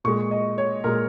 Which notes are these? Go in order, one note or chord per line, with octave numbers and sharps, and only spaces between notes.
A#2 G#3 C#6
D#5
C#5
A#2 G#3 A#4